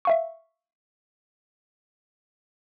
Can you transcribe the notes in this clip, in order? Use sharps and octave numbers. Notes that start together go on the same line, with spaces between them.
E5 F5 C#6